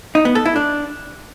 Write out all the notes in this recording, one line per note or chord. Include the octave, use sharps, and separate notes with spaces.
D#4
B3
A4
E4
D4